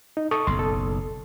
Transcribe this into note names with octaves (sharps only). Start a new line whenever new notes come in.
D#4
A4 C#6 D#6
F#1 B1 C6
A4